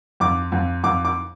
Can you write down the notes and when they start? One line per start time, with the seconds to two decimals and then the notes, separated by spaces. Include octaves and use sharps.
0.20 F2 D6
0.52 F2
0.84 F2 D6
1.05 D6